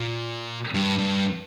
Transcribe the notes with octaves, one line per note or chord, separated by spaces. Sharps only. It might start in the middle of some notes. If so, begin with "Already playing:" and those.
Already playing: A#2
G2
G2